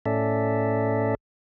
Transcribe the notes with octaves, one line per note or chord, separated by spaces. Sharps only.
A2 C#4 A4 D5 E5